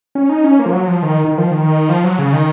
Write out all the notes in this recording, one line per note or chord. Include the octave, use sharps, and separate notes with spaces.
C#4
D#4
C#4
A#3
F3
F#3
F3
D#3
D#3
F3
D#3
F3
F#3
C#3
D#3